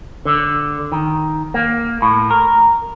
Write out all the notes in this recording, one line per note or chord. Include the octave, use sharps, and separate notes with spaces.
D3
D#3
A#3
A2
A#4